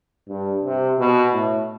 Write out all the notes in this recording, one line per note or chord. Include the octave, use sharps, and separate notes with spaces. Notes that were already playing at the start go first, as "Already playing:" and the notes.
G2
C3
B2
A2